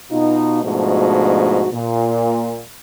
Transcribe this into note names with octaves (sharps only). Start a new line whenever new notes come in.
B2 D#4 F4
G#2 B2 F3 A3 D4 F#4
A#2